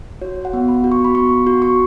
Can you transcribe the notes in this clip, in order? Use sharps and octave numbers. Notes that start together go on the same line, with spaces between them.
F#4 C#5
F#5
B3
B5
F#4
C#6
B5
B3 C#6
F#4
C#6